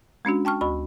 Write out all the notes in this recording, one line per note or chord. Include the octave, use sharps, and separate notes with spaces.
G#3 C#4 D4 F#4
G5 A5 C#6 F6
D2 F#4 B5 C#6